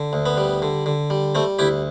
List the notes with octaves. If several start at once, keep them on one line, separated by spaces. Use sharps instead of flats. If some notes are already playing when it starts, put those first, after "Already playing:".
Already playing: D3
D2
B3
G3
D3
D3
G3
G3 A3 C4
D2 E4 G4